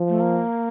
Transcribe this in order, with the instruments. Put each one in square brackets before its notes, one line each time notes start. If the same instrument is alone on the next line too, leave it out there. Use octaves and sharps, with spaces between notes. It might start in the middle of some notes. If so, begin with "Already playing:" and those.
Already playing: [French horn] F3
[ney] A3
A#3